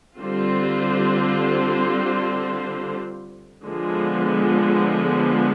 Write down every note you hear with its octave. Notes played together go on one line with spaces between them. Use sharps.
D3 G3 C4 F4 C5
D3 F3 G#3 B3